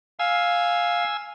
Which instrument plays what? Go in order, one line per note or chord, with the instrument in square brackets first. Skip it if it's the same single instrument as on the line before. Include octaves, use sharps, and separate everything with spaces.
[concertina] F5 [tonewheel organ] G#5 E6